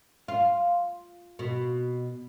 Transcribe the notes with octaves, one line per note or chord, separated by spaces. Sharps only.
F4
B2